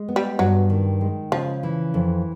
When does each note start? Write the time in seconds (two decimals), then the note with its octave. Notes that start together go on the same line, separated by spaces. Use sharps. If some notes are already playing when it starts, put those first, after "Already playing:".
Already playing: G#3
0.08 B3
0.16 G3
0.39 G2 F#3
0.70 D#3
1.01 G#3
1.32 C#3 F3
1.63 E3
1.94 F2